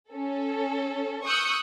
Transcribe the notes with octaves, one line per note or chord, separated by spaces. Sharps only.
C#4 A4
C#6 D#6 E6 F#6 G6 C#7